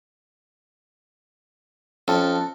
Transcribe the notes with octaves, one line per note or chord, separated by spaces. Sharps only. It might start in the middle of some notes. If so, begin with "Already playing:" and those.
F2 C#4 A5